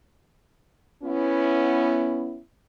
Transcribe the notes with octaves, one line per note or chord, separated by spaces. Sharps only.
B3 C#4 E4